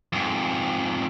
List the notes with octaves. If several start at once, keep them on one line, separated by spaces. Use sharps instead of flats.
F2 G#2